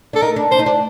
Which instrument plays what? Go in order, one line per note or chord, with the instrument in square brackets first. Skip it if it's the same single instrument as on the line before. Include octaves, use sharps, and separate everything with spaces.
[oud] D4 [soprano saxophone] A4
[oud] D#4 [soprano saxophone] A#4
[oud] D4
[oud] D4 [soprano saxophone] C5
[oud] D#4
D4